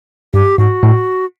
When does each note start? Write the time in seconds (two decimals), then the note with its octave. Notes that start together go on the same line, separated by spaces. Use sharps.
0.34 G2 G4
0.58 G#2 F#4
0.83 A2